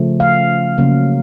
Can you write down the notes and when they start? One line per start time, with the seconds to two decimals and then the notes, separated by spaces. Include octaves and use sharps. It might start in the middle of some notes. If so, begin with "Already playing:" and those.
Already playing: C#3 F3 A3
0.20 F5
0.78 C#3 F#3 A#3